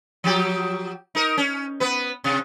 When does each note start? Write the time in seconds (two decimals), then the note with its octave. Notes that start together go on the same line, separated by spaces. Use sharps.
0.24 F3 F#3 G4
1.15 D#4 A#4
1.38 C#4
1.80 B3 B4
2.24 C3